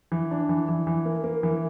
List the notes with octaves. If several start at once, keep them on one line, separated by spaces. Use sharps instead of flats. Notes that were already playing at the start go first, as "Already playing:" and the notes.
E3
D4
E3
E3
E3
A#3
A#3
E3